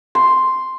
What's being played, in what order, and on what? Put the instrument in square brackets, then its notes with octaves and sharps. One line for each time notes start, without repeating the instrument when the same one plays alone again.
[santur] C6